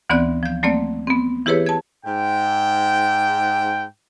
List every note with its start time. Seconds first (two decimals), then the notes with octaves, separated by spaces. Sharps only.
0.10 D2 E3 B3 C4 D5 F#6
0.43 F3 G6
0.63 F#3 A3 A#3 C4 D5
1.07 B3 C4
1.46 E3 E4 G4 G#4 B4 C#5
1.66 A5 G#6
2.06 G#2 G5